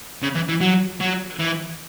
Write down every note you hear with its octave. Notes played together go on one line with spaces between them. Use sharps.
C#3
E3
E3
F#3
F#3
E3